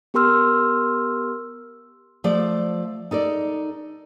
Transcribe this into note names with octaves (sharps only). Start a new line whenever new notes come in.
B3 G4 A#4 C6 E6 F6
F3 A3 C5 D5
D#4 A4 A#4 D5